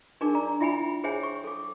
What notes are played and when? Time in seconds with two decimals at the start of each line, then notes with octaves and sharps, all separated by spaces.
0.21 D4 D#4 G#4 A#4 D6
0.35 D5 A#5
0.60 E4 F4 E5 G5 G#5 B5
1.04 G#4 C5 C#5 E5 G5 G#5
1.23 C#6
1.44 A4 D6